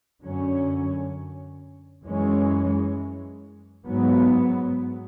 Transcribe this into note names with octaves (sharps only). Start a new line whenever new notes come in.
F#2 D3 F#3 C#4
F#2 E3 G#3 C#4
G#2 F#3 B3